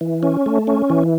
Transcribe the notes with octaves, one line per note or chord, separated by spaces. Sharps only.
E3
C#4
A3
C#4
E3